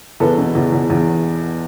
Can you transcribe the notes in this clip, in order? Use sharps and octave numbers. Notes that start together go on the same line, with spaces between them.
E2 A4 B4
B2
E2
E2
E2